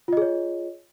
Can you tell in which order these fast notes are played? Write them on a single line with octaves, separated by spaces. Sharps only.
F4 D#5 G#4 C#5